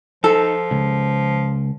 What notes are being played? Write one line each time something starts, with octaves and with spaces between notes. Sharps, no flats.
F3 D#4 A4
C#2